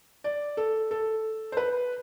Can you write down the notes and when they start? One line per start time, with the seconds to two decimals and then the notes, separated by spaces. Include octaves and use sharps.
0.24 D5
0.57 A4
0.91 A4
1.52 C5
1.57 B4